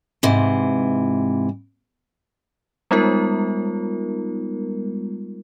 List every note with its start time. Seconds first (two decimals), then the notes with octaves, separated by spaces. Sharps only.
0.23 G#2 C3 E3
2.91 G3 G#3 B3 D#4 F4 A#4